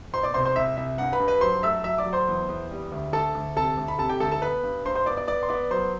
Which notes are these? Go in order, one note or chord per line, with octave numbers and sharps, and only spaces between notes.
B2 C5 C6
D5 D6
C2 C5 C6
C5 C6
C2 E5
C2 E5
G2 F#5
B4 B5
G2
B4 B5
F#3 C5 C6
A3 E5 E6
F#3 E5 E6
D5 D6
F#3
C5 C6
E2
E2
G3
D2
D2 A4 A5
D2
C3 A4 A5
D2
B5
C3 A4 A5
G4 G5
D2 A4 A5
A4 A5
B3 B4 B5
G2
G2 C5 C6
C5 C6
B3 D5 D6
D5 D6
B3 D5 D6
C6
B3 D5 D6
F#3 C5 C6